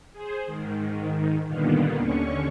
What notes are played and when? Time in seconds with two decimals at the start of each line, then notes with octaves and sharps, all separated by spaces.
0.13 G#4 C5
0.46 G#2 D#3
1.46 G2 A#2 D3 D#3 A#3 B3
1.96 D#2 D3 C#4 C#6